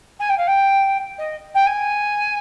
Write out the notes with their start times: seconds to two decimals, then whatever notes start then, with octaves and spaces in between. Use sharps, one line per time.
0.19 G#5
0.29 G5
0.37 F5
0.47 G5
1.18 D#5
1.54 G5
1.66 G#5